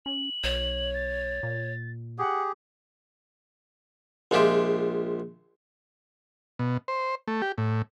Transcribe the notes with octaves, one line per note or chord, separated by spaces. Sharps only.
C#4 F#7
B1 C#5
A6
A#2
G4 G#4 F#5
A#1 G#3 F4 G4 E5
B2
C5
A3
G4
A2